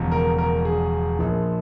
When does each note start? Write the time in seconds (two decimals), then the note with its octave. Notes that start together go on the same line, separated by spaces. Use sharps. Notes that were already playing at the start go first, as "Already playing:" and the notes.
Already playing: E1 E2 C#3 F3
0.11 A#4
0.38 A#4
0.65 G#4
1.19 A#1 A#2 F3